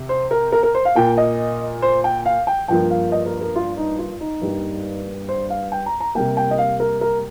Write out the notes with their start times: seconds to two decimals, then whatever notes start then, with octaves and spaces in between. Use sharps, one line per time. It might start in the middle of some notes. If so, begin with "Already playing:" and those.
Already playing: C3
0.09 C5
0.31 A#4
0.52 A#4
0.63 A#4
0.75 C5
0.85 F5
0.95 A#2 A#3 G5
1.17 D#5
1.82 C5
2.04 G5
2.26 F5
2.47 G5
2.68 G2 F3 A#3 G5
2.90 F5
3.12 D#5
3.26 A#4
3.41 A#4
3.56 F4
3.77 D#4
3.98 F4
4.20 D#4
4.41 G2 G3 A#3
5.29 C5
5.50 F5
5.72 G5
5.86 A#5
6.00 A#5
6.15 C3 G3 A#3 G5
6.37 G5
6.51 D#5
6.58 F5
6.80 A#4
7.01 A#4